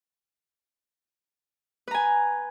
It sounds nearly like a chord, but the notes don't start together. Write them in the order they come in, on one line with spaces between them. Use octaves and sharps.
B4 A#5 G#5